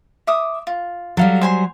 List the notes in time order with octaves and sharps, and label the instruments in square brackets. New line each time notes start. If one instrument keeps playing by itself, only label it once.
[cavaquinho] E5 D6 D#6
F4
[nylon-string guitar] F#3 G3 [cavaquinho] A4 F5
[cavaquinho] C5 G#5 C6